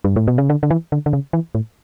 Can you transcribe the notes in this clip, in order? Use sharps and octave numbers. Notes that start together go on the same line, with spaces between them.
G2
A2
B2
C#3
D3
D3
E3
D3
D3
C#3
E3
A2